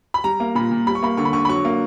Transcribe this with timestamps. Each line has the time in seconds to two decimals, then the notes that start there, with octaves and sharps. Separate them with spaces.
0.14 B5
0.24 G3 A#5
0.40 A#3
0.55 A#2 B5
0.71 A#2
0.87 G3 B5
0.95 C#6
1.03 A#3 B5
1.17 D3 C#6
1.25 B5
1.33 D3 C#6
1.45 B5
1.49 F#3 C#6
1.65 A#3